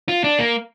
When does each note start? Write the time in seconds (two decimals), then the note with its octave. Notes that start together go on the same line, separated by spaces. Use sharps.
0.08 F4
0.24 D4
0.39 A#3